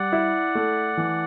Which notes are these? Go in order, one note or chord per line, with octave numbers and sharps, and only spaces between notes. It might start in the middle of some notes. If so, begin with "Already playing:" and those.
Already playing: G3 D5 F#5
E4
A3
E3